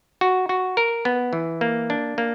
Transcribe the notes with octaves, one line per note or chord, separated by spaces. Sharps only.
F#4
F#4
A#4
B3
E3
A#3
D4
A#3